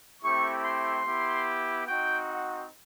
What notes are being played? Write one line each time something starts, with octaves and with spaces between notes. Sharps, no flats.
A3 C4 E4 G4 C#6
C6
B3 E4 G4
C4 D#4 F#4 G5
F#5